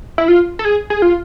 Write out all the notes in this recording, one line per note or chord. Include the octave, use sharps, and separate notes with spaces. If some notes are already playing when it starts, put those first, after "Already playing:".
E4
F4
A4
G#4
G#4
F4